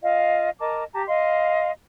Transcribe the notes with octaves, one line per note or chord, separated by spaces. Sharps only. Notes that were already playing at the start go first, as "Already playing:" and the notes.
F4 D#5 F5
A#4 D#5 A5 D6
G4 A5 A#5
D#5 F5 C6